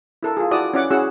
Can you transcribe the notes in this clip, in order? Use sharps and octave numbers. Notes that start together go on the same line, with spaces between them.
E4 A4 A#4
F4 G#4
E4 F#4 D5 A5 D#6
C#4 E4 C#5 D5 F#5 D6
C#4 E4 F#4 G#4 F#5 E6